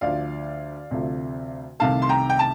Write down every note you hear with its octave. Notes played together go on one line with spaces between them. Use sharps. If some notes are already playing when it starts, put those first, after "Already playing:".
D2 D3 F3 D5 F5
D2 C3 F3 A3
C2 C3 D#3 A3 F5 A5
C6
G5 A#5
G5
A5